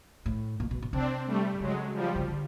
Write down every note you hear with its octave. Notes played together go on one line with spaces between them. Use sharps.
A2
A#2
B2
B2
C3 C4 D4
G3 A3
C#3 F#3 G#3
F3 G3
C#3
D3